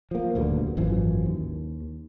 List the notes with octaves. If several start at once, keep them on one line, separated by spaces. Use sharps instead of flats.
F3 A#3
D#1 D2 G2 D3
G#1 F#2 E3 F3
D#2